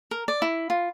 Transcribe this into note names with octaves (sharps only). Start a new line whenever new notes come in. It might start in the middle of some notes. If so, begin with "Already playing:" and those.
A#4
D5
E4
F4